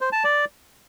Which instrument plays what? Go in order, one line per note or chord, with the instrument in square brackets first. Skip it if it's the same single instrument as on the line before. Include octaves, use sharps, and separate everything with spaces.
[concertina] C5
A5
D5